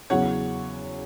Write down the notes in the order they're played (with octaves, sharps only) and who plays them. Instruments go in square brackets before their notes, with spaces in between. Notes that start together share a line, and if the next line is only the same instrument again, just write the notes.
[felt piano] E2 C#3 F#3 C#4 E4 [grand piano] C#5 F#5